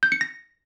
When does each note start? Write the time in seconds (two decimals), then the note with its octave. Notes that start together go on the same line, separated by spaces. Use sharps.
0.03 G6
0.12 C#7
0.21 A#6